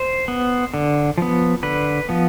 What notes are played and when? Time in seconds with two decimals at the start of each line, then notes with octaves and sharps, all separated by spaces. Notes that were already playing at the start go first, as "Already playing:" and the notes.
Already playing: C5
0.28 B3
0.74 D3
1.18 F3 B3
1.63 D3 B4
2.09 F3 B3